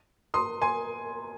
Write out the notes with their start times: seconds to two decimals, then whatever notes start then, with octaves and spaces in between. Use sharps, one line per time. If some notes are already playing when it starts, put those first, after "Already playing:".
0.34 C6 D#6
0.62 G#5 C6